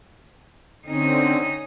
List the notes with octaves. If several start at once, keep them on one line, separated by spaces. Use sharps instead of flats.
D3 C4 C#4 D#4